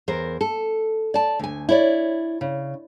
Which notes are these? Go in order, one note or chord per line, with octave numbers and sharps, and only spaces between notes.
E2 A#4 C5
A4
D5 A5
D2 G#5
E4 C#5 D5
C#3